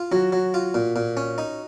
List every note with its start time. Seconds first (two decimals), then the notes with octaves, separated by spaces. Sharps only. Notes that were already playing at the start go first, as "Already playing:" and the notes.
Already playing: F4
0.11 F#3 F#4
0.32 F#3
0.54 F4
0.74 A#2
0.96 A#2
1.17 C#4
1.38 D#4